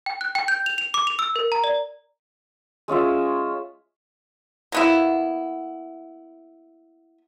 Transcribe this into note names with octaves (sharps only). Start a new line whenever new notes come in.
G5
F#6
G5
G6
F7
F7
D6
F7
E6
A#4
A#5
D5
G#3 C#4 F4 E5
A#3 B3 E4